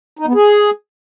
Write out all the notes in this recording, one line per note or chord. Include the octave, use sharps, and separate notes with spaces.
D#4
B3
G#4